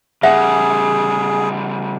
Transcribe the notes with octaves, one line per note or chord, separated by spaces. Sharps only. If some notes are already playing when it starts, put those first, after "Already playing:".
C#3 G3 G#4 E5 F#5